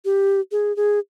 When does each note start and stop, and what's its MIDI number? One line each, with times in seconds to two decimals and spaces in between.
0.05 0.40 67
0.52 0.75 68
0.76 0.99 68